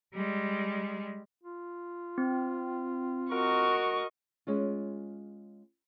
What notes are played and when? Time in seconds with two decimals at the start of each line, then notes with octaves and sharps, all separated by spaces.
0.14 G3 G#3
1.43 F4
2.18 C4
3.31 F#4 A#4 D#5 C#6
4.47 G#3 C#4 F4